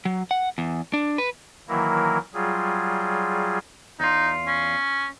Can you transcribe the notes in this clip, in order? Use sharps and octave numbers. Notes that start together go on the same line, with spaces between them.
F#3
F#5
E2
D4
B4
D#3 E3 F#3 A#3 E4 A#4
F#3 G3 F4 G#4
E2 D#4 F4
C#4